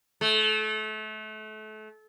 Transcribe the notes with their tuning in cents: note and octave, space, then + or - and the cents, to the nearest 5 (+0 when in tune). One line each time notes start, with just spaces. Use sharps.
A3 -30